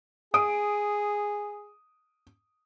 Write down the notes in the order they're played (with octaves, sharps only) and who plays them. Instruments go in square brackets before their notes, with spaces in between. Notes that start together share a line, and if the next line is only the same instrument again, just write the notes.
[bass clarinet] G#4 [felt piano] D#6 D7